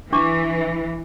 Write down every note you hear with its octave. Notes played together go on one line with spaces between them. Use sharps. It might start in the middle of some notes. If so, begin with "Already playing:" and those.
E3 D4 C#6 D6